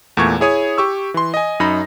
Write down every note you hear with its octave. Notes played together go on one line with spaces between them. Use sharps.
E2 A#2 A3 C#6 G#6
E4 G#4 C#5 G#5 D#6
G4 C#6 E6
E3 C6
D#5 G#5
F#2 D#4 B5 A#6